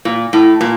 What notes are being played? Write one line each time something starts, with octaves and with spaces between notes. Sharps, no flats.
A#2
A2
A#2